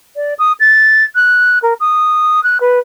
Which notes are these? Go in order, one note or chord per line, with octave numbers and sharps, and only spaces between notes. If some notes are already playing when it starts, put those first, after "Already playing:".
D5
D#6
A6
F#6
A#4
D#6
F#6
B4